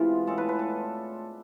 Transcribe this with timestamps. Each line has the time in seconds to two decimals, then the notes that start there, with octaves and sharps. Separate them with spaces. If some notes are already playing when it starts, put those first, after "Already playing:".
Already playing: C3 E3 G#3 B3 F4
0.27 A2 G#3 D4 A4
0.38 B4
0.49 B4
0.59 A4